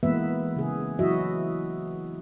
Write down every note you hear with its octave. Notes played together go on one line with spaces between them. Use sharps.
E3 G#3 A#3 B3 B4 E5
C#3 G#4
E3 F#3 E4 F#4 D#5 E5